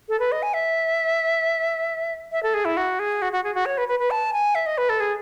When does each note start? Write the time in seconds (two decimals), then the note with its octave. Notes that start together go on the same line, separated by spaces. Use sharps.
0.09 A4
0.20 B4
0.32 D#5
0.43 G#5
0.54 E5
2.32 E5
2.43 A4
2.54 G#4
2.65 E4
2.77 F#4
2.99 G#4
3.22 F#4
3.33 F#4
3.44 G#4
3.55 F#4
3.66 C#5
3.78 B4
3.88 B4
4.00 B4
4.11 A5
4.33 G#5
4.55 E5
4.66 D#5
4.78 B4
4.89 A4
5.00 G#4